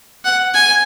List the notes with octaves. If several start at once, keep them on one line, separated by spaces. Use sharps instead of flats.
F#5
G#5